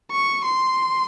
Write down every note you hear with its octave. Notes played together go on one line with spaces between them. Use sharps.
C#6
C6